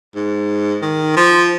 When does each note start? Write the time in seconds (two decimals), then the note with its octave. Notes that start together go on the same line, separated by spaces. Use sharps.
0.16 G#2
0.82 D#3
1.16 F3